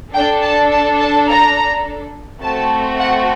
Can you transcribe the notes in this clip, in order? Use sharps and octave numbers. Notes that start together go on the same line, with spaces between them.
D4 A4 G5
A5
A5
A5
A#5
A3 C4 F#4 A4 A5
F#5